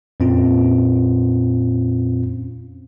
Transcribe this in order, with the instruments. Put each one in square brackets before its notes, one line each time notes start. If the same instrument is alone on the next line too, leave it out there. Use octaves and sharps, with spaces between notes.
[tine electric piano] F2 A#2 C4 C#4 F4